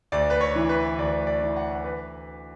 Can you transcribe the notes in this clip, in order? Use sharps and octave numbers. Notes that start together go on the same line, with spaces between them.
D2 D5
B4
C#5
E3
B4
D2 D5
D5
E3
F#5
B4